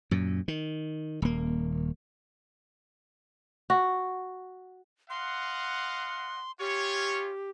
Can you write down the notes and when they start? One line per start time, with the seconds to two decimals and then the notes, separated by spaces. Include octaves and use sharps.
0.11 F#2 A#2
0.48 D#3
1.22 D#1 A#3
3.70 F#4
5.10 D#5 F5 F#5 C6
6.60 C#4 F4 G4 C#5